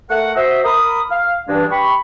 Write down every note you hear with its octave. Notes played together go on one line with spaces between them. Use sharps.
A3 A#4 F#5
F#4 C5 D#5 E5
A#4 B5 D#6
F5
G2 E3 G#3 D4
G4 B5 C#6